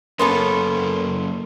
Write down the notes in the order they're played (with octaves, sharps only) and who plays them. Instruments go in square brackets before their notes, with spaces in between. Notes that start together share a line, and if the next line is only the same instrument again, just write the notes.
[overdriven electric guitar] F#2 A#3 [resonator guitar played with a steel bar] B3 C#4 A4 [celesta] A#4 C6